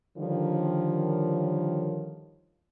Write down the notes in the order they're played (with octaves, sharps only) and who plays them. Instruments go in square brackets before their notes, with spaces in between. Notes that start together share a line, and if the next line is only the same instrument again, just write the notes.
[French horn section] D3 D#3 F3 G3 A#4 C#5